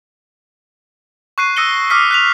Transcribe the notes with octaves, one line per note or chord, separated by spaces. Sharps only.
C#6 F#6 C7 D#7
D#6 E6 A#6 C#7 D#7 G7
D6 D#6 F6 B6 C7
F#6 B6 F7